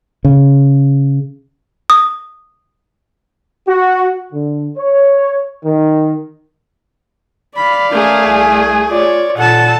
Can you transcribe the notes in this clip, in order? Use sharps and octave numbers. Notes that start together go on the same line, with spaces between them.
C#3
D#6
F#4
D3
C#5
D#3
D5 F5 B5
A3 C#4 G#4 A#4
C2 G#5
F4 C#5 D5
A#2 A4 F#5 A5